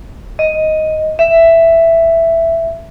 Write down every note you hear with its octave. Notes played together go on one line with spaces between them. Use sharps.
D#5
E5